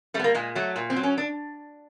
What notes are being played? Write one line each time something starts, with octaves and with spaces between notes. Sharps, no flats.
G3 A3
B3
A#3
A#2 G#3
F#3 A3
A#2
C4
F#3
C#4
D4